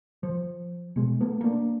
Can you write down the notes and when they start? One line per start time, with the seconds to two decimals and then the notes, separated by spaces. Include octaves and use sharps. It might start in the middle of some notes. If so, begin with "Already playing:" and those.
0.23 F3
0.96 B2 G#3
1.21 A3 B3
1.41 A#3 D4